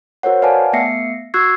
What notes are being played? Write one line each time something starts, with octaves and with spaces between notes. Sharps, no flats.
F#4 A#4 C5 C#5 F#5
B4 D5 F5 F#5 G#5 A5
A3 B3 E5 A#6 C7 C#7
F#4 C#6 E6 F#6 G#6 C7